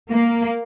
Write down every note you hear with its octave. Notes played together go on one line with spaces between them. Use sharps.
A#3